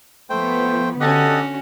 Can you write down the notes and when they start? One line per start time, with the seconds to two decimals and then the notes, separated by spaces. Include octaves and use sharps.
0.30 F3 A3 B3 C5 G5
1.00 D3 C#4 F#4 G4 A4 D#5 F#5